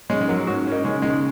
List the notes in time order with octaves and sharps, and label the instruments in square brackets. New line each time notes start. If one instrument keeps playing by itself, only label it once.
[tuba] G#2 [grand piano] G#3 C#4
[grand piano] G#3
F#3 A#3
[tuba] G#2 [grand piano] C#4 F#4
[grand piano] C#4
A#3 D#4
[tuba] C#3 [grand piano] G#3 C#4
[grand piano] D#3 G#3